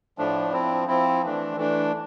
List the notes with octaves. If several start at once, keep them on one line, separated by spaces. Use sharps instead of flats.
A2 F3 A3 D4
F3 C4 E4
F3 C4 E4
E3 A3 D4
E3 A3 D4